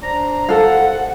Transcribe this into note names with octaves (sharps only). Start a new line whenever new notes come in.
D4 C5 A#5
C2 A4 C5 F5 F#5